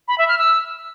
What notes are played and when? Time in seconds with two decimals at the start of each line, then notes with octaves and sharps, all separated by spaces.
0.08 B5
0.18 E5
0.28 F6
0.39 E6